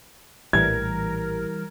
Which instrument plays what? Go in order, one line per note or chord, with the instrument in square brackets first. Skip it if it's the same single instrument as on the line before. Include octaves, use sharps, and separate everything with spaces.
[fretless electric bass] A#1 A2 [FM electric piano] E3 G3 [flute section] A#4 [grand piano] G#6